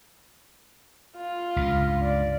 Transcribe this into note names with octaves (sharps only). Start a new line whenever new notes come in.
F4
C#2 G2
D5